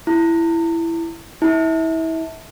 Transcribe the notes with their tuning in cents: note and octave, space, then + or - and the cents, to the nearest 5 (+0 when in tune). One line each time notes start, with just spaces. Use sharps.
E4 +10
E4 -30